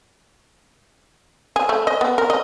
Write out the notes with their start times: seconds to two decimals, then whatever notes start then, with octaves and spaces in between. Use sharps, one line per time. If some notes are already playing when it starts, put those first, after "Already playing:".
1.56 G#4
1.69 A3
1.87 D#5
2.01 B3
2.18 A#4
2.30 D#5